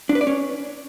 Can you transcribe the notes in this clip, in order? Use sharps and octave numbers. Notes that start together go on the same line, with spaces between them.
D4
B4
D5
C#4